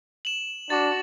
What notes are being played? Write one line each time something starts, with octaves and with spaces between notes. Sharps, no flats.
E7 F#7
D4 F#4 A6